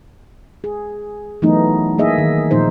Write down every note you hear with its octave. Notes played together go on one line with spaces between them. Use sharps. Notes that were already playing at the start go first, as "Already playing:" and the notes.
G#4
E3 F#3 A3 B3 D#4
A#3 D#4 G#4 D#5 E5
D#3
A#2 F3 D#4 C5